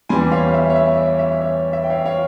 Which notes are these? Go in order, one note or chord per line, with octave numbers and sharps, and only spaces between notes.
E2 E3 G3 G#5 C6
C#5 F5
E5
C#5
E5
C#5
E5
C#5
E5
G5
C#5 F5
C#5 F5